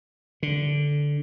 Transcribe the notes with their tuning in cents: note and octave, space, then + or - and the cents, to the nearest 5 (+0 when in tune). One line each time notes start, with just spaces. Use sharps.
D3 -10